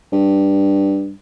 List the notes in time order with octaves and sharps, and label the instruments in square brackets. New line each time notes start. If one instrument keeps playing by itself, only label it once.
[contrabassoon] G2